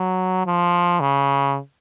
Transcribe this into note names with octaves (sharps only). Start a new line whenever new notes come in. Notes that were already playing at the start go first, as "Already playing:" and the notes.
Already playing: F#3
F3
C#3